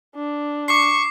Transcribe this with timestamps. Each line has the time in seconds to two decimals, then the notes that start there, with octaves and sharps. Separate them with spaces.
0.16 D4
0.68 C#6 D6 C7